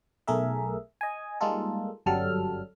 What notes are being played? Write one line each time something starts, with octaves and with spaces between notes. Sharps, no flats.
B1 A3 G#4 A#4 E5
D#5 G#5
G3 G#3 A#3 D#4 F4 A4
G1 F#2 F#3 G3 A4 F6